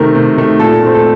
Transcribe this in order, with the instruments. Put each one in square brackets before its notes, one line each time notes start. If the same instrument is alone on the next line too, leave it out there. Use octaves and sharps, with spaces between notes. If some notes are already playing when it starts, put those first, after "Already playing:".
Already playing: [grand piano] C3 D#3 A3 A#4
C3
D#3 A3
A#2 A4
A3 C4
A4